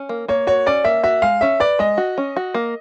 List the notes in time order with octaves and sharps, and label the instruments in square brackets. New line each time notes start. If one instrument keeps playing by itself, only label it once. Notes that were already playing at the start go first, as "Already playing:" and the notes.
Already playing: [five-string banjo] C#4
A#3
[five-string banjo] A#3 [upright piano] C#5
[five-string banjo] F#4 [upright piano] C#5
[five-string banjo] C#4 [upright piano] D5
[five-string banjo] A#3 [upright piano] E5
[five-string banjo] F#4 [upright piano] E5
[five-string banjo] G#3 [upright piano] F5
[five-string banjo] C#4 [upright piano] E5
[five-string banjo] B4 [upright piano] D5
[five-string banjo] G#3 [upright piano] D#5
[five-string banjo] F#4
C#4
F#4
A#3